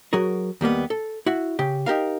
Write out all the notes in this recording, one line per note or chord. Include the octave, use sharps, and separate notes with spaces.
F#3 F#4 G#4 A#4
D#2 G3 A#3 B3
A4
E4 F#4
C#3 G4
D#4 G4 A#4 F5